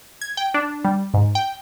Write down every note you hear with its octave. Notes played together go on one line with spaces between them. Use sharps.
G#6
G5
D4
G3
G#2
G5